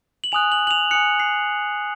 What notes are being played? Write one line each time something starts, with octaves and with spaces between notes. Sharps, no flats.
F#7
G#5 D#6 F#6 F7
F#7
F#7
F7
G#5 D#6 F#6 C#7
C7